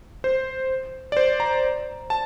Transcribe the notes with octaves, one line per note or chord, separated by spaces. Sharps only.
C5
D5
C5
A#5
A5